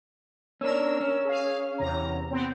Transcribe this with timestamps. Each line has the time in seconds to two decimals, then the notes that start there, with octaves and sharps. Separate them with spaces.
0.61 C#4 D4 A#4 E6
1.01 C#4
1.25 G#4 F5
1.78 E2 C3 A#5
2.31 B3 C4